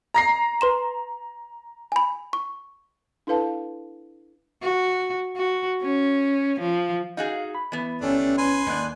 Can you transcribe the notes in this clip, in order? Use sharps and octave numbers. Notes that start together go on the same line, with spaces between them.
A#5 A#6 C7
B4 C6 E7
G#5 B5
C#6
D4 E4 A4 B4 F5 A5
F#4
F#4
C#4
F3
D#4 F#4 G#4 F5
B5
E3 B3
G1 G3 A3 C#4 D4
B4 G#5 C6
D#2 G#2 A#3 D4 F#6